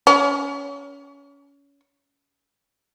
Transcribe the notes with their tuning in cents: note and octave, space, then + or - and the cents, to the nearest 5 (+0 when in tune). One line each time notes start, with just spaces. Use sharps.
C#4 +25